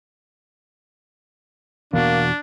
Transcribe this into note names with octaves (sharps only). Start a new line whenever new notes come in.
E2 B2 A#3 D4 F#4